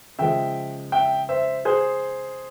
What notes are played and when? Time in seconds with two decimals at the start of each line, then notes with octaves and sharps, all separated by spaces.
0.19 C#3 F3 G#3 E5 G5
0.92 E5 G5
1.29 C5 E5
1.65 G#4 C5